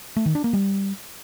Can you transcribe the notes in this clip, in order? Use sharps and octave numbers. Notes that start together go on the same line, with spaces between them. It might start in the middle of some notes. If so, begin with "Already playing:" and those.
A3
D#3
D4
A#3
G3